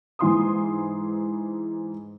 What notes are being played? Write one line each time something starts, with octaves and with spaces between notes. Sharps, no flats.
G#2 E3 C6 D#6